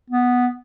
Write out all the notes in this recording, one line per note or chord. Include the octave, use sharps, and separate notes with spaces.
B3